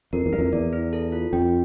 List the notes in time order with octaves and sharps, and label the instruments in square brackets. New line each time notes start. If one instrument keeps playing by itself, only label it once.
[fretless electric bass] F2 [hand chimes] A#4
[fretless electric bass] E2
[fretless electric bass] G2 [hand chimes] E4
[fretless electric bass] F2
[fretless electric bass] E2 [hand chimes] D5
[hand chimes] E4
A4
F4
[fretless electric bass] F2 [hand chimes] G5